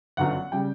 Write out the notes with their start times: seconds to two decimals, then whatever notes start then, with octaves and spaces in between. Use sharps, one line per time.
0.17 G1 F#2 D3 F#3 F#5
0.52 C#3 G3 G5